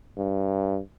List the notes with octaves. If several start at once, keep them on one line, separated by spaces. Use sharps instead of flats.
G2